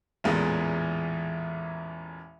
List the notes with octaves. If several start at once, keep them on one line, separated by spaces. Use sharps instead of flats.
A1 E2 A#2 G#3